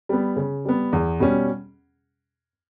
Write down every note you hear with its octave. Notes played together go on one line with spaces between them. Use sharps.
G3 B3
C#3
G3 B3
E2
B2 G3 C#4